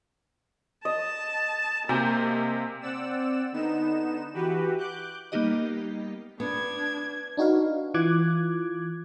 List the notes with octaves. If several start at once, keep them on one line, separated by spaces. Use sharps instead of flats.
D#5 A5
C3 A#3 G#5 A#5 G6
C4 D5 F#5 E6 E7
D3 B3 D#4 E7
E3 F#4 G4 B4
D6 F#6 G6
G3 A#3 B3 D#4 G4 D#5
B3 D4 G#6
D4 D#4 F#4 B4 F5
E3 F4 D6 F#6 G#6